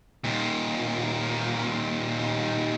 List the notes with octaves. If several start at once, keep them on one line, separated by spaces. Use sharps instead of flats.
D#2 A#2